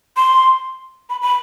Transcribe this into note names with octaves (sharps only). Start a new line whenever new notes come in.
C6
B5
B5